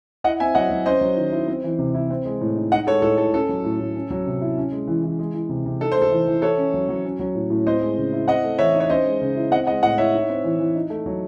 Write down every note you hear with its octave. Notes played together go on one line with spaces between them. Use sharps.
E4 D#5 F#5
C4 E5 G#5
F#3 D#5 F#5
F#3
C#4 C5 D#5
F#3
D#3
E4
C4
E3
C3
E4
C4
G#3
A2
D#4
D#4 D#5 F#5
G#3 A4 C#5
A2 A4
A2 A4
C#4 A4
F#3
A2
A2
C#4
F#3
C3
E4
C#4
G#3
E3
E3
G#3
E3
C3
C3
D#4 A4
A3 C5
A4
E3
E3
E4 A4 C#5
C#4
F#3
F#3
C#4
F#3
A2
A2
C4 C5 D#5
G#3
C#3
E4
C4 D#5 F#5
A3
E3 C#5 E5
D#4
C#5
C#4 C5 D#5
G#3
C#3
E4
C4 D#5 F#5
G#3 D#5 F#5
A2 D#5 F#5
E4 C#5 E5
D#4
C4
E3
E3
D#4
A3
F#3